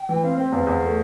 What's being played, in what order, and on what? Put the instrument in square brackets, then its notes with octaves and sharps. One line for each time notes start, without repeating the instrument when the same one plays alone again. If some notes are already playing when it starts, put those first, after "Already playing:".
Already playing: [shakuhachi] G5
[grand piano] E3
[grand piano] C4 [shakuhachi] F5
[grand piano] C4 [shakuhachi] G5
[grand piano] E2 [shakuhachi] F5
[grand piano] E2 [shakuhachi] F5
[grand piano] A3